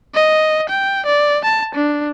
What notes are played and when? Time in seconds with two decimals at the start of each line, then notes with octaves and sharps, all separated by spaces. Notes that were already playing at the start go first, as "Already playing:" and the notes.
0.15 D#5
0.69 G5
1.06 D5
1.45 A5
1.75 D4